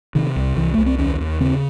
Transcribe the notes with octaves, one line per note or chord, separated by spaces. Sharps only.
C3 D#3
C2
C2 E3
C2 A3
C4
D#2 C#4
D#2
C#3 C4